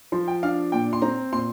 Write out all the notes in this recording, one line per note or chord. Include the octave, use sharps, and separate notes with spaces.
F3 C6
G5
D4 F5
A#2 G5
C6
C4 A#5
A#2 C6